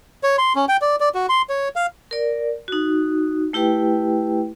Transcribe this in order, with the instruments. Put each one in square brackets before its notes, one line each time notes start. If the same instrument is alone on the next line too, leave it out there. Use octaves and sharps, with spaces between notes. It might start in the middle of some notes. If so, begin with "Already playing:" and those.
[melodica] C#5
C6
C#4
G5
D5
D5
F#4
C6
C#5
F5
[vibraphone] A#4 D5
D#4 F#4
A3 E4 G4 B4 G5